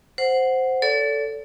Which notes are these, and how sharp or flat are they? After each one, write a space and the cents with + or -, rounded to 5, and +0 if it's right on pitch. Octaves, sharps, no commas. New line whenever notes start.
C5 -5 F#5 +0
A4 +0 D5 -40